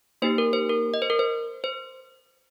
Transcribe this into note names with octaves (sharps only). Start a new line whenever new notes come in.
A#3 D#4 G4 C5
A#4
C5
A#4
D#5
C5
A#4
C5
C5